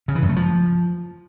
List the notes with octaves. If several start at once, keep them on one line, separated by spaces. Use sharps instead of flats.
C#3
E3
F#2
A3
F3